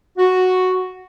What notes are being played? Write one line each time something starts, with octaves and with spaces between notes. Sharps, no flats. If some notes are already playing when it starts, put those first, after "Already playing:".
F#4